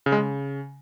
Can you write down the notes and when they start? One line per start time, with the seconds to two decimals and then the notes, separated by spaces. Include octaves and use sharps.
0.06 C#3
0.12 G#3
0.18 C#3